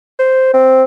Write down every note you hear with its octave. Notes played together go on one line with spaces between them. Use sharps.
C5
C4